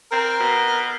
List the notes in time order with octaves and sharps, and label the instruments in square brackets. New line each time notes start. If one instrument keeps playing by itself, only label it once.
[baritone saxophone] C4 [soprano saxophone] A#4
[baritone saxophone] B2